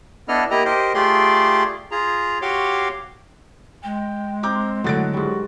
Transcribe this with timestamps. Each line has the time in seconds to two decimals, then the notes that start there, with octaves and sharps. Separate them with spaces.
0.28 B3 D4 E4 A4 D#5 F6
0.51 A#3 E4 G4 D#5 A#5
0.65 G4 A#4 C5 D#5
0.94 A3 F4 G4 G#4 D5 C6
1.91 F4 G#4 A#5
2.42 F#4 G4 C#5 F5 C6 D6
3.84 G#3 G5
4.43 C4 A#5 D6 G6
4.84 A2 D3 F#3 F#4 F#5 A6 D7
5.13 G#2 G3 F#4